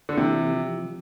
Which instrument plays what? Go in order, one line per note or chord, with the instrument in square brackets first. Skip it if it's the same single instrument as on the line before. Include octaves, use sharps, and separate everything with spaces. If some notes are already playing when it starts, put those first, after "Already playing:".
[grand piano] D3
[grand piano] C3 [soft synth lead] E3
[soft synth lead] F3
F3